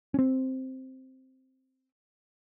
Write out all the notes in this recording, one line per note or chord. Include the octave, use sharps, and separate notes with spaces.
C4 C#4